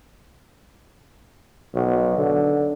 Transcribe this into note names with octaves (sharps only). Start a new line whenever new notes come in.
B1
D3